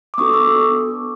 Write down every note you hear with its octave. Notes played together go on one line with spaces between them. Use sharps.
D6
B3 D4 F#4 A4 C#6 D#6
D6 E6
B3 D4 F#4 A4